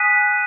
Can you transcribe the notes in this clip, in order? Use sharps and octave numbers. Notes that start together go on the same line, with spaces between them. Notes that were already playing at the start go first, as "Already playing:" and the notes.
Already playing: G#5 D#6 F#6 B6 D#7